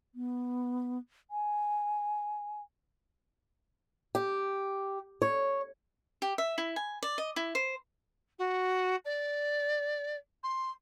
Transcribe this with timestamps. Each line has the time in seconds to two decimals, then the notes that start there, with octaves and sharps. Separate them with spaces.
0.15 B3
1.31 G#5
4.15 G4
5.22 C#5
6.22 G4
6.38 E5
6.58 E4
6.76 G#5
7.03 D5
7.18 D#5
7.36 E4
7.55 C5
8.39 F#4
9.05 D5
10.43 C6